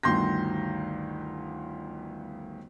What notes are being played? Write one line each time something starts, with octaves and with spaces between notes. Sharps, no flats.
G1 D2 D#3 C6 G6 A#6